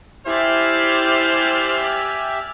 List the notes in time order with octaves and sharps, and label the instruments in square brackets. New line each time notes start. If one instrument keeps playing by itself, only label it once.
[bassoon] E4 [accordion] G4 E5 G#5 [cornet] C5 [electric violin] D5 F6